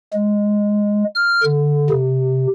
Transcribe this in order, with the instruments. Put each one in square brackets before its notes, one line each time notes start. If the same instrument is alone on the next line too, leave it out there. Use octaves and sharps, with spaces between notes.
[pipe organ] G#3
F6
D3
C3